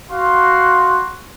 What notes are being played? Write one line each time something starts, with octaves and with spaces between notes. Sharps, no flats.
F#4 F5 C6